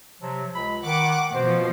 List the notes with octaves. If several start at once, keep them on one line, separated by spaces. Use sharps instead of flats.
C3 F3 F#3
C#2 B5
D#3 F#5 D6
B2 F3 C5